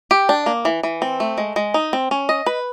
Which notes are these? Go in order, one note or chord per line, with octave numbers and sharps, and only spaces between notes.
G4
D4
A#3
E3
E3
C4
A3
G#3
G#3
D#4
C4
C#4
D#5
B4